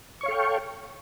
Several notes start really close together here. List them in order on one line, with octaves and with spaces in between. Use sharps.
C#6 C#5 F5 A4 G5